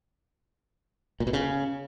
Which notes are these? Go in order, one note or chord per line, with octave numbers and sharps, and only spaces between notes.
A#2
B2
C#3